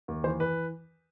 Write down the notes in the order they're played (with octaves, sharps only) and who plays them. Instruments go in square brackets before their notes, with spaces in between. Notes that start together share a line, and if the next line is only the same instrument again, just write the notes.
[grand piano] D#2
E3 C5
E3 B4